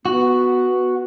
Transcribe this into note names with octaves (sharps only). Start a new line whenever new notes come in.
B3 F#4